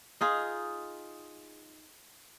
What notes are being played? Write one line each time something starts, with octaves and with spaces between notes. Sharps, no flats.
D#4 F4 G#4